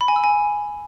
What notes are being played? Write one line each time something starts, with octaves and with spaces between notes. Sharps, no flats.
B5
G#5
E6
G#5